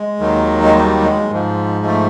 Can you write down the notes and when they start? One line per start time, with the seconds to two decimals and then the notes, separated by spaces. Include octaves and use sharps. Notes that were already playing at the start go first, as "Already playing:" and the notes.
Already playing: G#3
0.19 D#2 D#3 F#3
0.63 G#3
0.75 G3
1.02 G#3
1.30 G#2 F3
1.80 G#3
1.86 A3